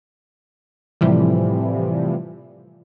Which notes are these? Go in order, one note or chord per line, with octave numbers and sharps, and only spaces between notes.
A2 C3 E3 F3 G3